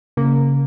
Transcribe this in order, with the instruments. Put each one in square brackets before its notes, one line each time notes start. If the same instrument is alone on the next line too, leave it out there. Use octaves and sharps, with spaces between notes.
[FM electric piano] C#3 [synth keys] A#3